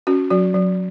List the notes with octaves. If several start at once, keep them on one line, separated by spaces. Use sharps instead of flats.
C#4 F#4
F#3 F#4
F#3